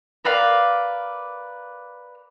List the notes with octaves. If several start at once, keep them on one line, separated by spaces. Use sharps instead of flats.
A#4 B4 D5 F5